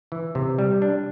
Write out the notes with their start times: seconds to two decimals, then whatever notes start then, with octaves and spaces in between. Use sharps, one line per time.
0.12 E3
0.35 C3
0.58 G3
0.82 D4